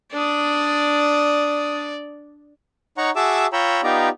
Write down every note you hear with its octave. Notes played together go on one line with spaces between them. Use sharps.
D4 D5 D#6
D#4 C#5 F#5 A#5 C#6
F#4 G#4 E5 A5 D6 E6
F4 C#5 G5 A#5 B5 E6
B3 D#4 F4 G4 D5 A#5